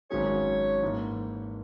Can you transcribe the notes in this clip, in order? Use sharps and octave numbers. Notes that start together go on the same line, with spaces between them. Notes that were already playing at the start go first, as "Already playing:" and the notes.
G#1 G#2 F#3 C#4 G#4 C#5
G#2 E3 A#3